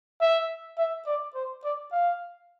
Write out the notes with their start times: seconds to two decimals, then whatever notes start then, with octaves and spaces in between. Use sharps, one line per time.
0.21 E5
0.78 E5
1.07 D5
1.35 C5
1.64 D5
1.92 F5